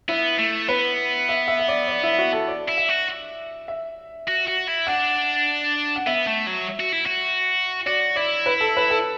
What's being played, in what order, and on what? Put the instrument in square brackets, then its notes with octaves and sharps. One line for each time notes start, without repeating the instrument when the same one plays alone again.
[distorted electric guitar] B3 [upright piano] E4
[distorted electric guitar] A3
[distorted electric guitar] B3 [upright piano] B4
[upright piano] E5
E5
E5
D5
D5
E4
F#4
A4
D5
[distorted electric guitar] E4
[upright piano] E5
[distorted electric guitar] F#4
[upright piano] E5
[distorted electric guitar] F#4
F#4
E4
[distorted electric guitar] D4 [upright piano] F#5
[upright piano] F#5
[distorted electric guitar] B3 [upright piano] E5
[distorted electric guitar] A3
F#3
F#4
E4
F#4
[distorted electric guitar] F#4 [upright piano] D5
[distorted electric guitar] E4 [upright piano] D5
[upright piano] B4
A4
B4
A4